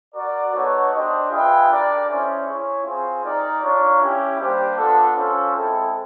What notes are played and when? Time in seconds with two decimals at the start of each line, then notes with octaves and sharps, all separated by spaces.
0.15 F#4 A#4 D5
0.53 B3 D#4 F#4 A4 C#5
0.91 D4 G4 C5 D#5
1.30 F4 G#4 B4 E5 G5
1.68 D4 G4 A#4 D5
2.07 C#4 E4 G#4 C5 E5
2.46 E4 G#4 C#5
2.84 C4 F4 G#4 C5
3.23 D#4 G4 A#4 D5
3.62 D4 F4 A#4 C#5
4.00 C#4 E4 G4
4.38 G3 A#3 D4 G4 C5
4.76 B3 D4 F4 A4
5.15 C#4 F4 A4 C5
5.54 G#3 C4 E4 A4